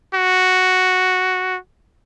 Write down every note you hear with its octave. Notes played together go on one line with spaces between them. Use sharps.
F#4